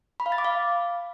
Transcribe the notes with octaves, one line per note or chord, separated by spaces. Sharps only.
B5
F5
A6
D6
F5